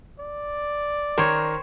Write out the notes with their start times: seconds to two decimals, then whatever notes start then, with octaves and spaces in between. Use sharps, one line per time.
0.20 D5
1.18 D#3 A#4 C5 C#5